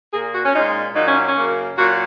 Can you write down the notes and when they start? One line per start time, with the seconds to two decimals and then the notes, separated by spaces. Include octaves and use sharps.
0.12 A#3 G#4
0.16 A#2
0.33 F#4
0.45 C#4
0.53 A#2 G#3 D#4
0.95 A#2 F#3 A#3 D#4
1.06 C#4
1.27 C#4
1.36 F#2 C#3 A#3
1.77 A#2 F#3 A#3 F#4